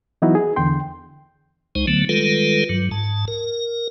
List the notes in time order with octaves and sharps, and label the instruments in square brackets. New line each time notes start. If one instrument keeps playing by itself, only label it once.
[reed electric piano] E3 F#3 B3 D#4 E4 F#4
G#4
E2 D3 E3 G5 C6
[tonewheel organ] C#2 G#3 D#4 C5
D3 F#3 A3 B3
D#3 G3 G#3 F4 A4 B4
G2 F#3
G#2 A5
A#4